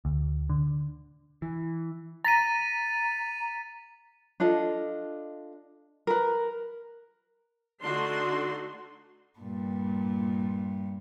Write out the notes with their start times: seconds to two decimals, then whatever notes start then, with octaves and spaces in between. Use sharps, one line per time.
0.05 D2
0.50 D3
1.42 E3
2.25 A#5 A6 B6 D#7
4.40 D4 F4 A4 D#5
6.07 A#4 B4
7.82 D3 A3 D4 D#4 F#4 C6
9.39 G2 A#2